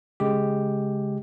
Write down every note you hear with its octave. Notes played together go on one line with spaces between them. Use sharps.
C#3 G#3 G4